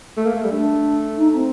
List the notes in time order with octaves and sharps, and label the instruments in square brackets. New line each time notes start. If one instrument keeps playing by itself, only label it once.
[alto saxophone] A3
A#3
A3
G3
[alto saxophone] A3 [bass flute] D4
[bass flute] D#4
C4